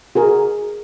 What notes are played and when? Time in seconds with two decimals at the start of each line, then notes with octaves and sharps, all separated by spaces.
0.15 F#4 G#4 A#4